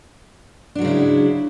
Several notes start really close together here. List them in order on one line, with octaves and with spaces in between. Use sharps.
D4 F#3 G#3 C#3 E4